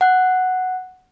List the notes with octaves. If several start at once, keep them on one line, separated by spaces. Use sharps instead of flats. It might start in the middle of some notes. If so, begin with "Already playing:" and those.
F#5 F#6